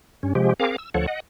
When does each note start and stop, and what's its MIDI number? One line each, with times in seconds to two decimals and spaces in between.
0.23 0.33 43
0.23 0.33 61
0.35 0.54 48
0.35 0.54 53
0.35 0.54 56
0.35 0.54 67
0.60 0.76 60
0.60 0.76 68
0.60 0.76 70
0.60 0.76 77
0.60 0.76 86
0.78 0.90 88
0.94 1.06 38
0.94 1.06 53
0.94 1.06 69
0.94 1.06 73
0.94 1.06 78
1.07 1.20 75
1.07 1.20 78